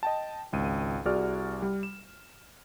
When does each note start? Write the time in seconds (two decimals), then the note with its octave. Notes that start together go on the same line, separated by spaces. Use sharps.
0.03 D#5 G5 A5
0.52 G#1 C#2 D#7
1.05 C2 F#4 G#4 D5 F6
1.62 G3
1.83 E7